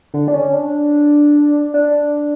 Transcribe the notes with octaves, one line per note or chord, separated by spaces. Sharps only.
D3
D4
C#4
D4
D4